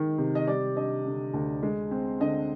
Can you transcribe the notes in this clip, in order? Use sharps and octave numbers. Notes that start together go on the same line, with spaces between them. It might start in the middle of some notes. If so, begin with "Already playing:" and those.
Already playing: D#3 G#3 D#4
C3
D#5
G3 D5
D4 D#5
D3
D2
G#3
C4
D3 D#5